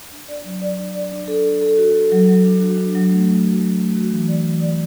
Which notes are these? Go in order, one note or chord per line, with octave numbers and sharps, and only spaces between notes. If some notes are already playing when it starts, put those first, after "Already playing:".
D4
D5
F#3
D5
D4
D5
D4
A4
A4
A4
F#4
A4
F#3
F#3
D4
F#4
D4
F#3
A3
F#3
F#4
F#3
A3
F#4
E3
D5
E3
D5